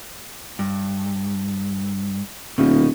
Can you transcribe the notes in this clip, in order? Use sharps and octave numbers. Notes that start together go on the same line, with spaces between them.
G2
D#1 B2 D#3